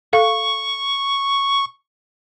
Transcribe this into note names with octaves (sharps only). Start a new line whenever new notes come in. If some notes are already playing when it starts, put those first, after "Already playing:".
A4 F5 C#6